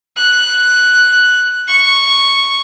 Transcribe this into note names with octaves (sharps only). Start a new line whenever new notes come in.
F#6
C#6